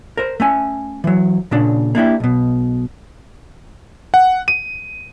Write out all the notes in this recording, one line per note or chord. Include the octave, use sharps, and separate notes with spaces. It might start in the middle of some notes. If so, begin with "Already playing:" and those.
A#4 C5
A3 C#4 G#5
E3 F#3
A#2 C#3 D4
A#3 D4 E4 G4
B1 B2
F#5
D#7